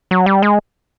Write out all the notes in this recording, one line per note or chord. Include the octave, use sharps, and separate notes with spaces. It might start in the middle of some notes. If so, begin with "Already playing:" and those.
F#3
G3
G#3